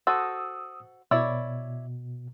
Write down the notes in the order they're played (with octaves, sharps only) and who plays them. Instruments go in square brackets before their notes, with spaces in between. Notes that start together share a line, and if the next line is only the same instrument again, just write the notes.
[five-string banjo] F#4 A4 C5 [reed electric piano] D#6 E6
[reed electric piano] B2 [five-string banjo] E4 C#5 D5